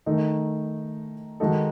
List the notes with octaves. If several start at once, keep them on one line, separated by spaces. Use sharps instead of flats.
D#3 A3 D#4
D#3 G#3 D#4 F#4 A4